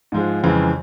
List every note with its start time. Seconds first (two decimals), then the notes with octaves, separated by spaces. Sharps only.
0.12 G#2 F3 G#3
0.43 F2 C#3 E3 G#3